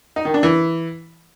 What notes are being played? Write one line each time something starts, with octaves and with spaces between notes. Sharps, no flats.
D#4
D#3
D4
E3